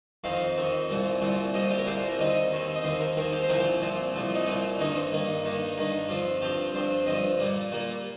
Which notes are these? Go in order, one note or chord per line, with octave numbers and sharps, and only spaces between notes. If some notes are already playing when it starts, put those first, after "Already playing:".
F2 D#3 C4 F5
F2 D#3 C4
C2 A#2 G3 C4
C2 A#2 G3 C4
C2 A#2 G3 C4 D#5
G4
A#4
C2 A#2 G3 C4 C5
A#4
D#2 D#3 C4 D#5
D#2 D#3 C4
D#5
D#2 D#3 C4 C5
A#4
D#2 D#3 C4 A#4
G4
C5
C2 A#2 F3 C4 A#4
G4
C2 A#2 F3 C4
C2 A#2 F3 C4
D#4
C2 A#2 F3 C4 F4
G2 D#3 A#3 D#4
C4
G2 D#3 A#3
G2 D#3 A#3
G2 D#3 A#3
G2 F3 C4 F4
G2 F3 C4 G4
G2 F3 C4 C5
G2 F3 C4 D#5
A#2 G3 A#3
A#2 G3 A#3